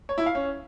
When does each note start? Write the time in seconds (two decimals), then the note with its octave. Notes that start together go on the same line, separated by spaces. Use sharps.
0.09 C#5
0.18 E4
0.26 F5
0.35 C#4